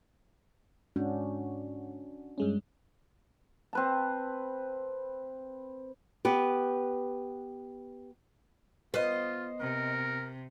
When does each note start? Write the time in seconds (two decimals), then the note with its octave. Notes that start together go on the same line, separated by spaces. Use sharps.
0.96 G#2 C#4 D4 F#4
2.38 G2 G#3 C#4
3.73 C4 B4 A5
6.25 B3 G4 B4
8.94 B3 F4 C5 D#5
9.60 C3 A#4